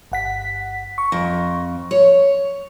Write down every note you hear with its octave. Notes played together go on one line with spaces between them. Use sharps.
G1 F#5 B6
C#6
F2
C#5